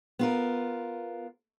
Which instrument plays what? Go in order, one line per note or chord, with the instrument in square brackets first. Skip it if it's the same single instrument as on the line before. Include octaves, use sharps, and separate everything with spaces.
[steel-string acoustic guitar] B3 F4 A#4